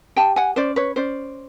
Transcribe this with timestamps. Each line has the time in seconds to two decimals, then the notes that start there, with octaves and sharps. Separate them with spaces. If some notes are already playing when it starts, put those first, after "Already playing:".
0.16 G4 G5 A5
0.36 F#5 G#5
0.56 C#4 C5 D5
0.76 B4 C#5
0.96 C#4 C5 D5